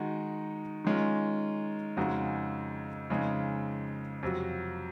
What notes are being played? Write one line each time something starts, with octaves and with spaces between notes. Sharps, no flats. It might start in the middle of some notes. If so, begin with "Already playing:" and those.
Already playing: D#3 G#3 D#4 F#4
D#3 G#3 C#4 F4
F2 C#3 G#3 D#4 F#4
F2 C#3 G#3 D#4
F2 C3 F#3